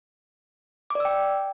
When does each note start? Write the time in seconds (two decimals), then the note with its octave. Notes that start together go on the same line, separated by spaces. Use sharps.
0.90 D6
0.95 D5
1.00 E6
1.05 G5